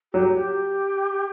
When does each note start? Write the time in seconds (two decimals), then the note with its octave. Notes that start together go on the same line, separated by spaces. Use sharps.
0.13 F#3 G4
0.36 G4